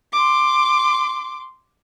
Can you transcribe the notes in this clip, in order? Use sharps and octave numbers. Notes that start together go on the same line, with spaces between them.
C6 D6